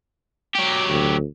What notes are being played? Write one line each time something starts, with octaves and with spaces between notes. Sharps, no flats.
F#3 G4
D2